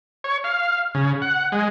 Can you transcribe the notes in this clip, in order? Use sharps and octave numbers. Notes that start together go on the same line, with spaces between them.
C#5
F5
C#3
F#5
G#3